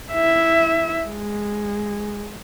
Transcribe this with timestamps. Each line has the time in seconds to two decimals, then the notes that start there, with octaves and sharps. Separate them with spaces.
0.13 E4 E5
1.06 G#3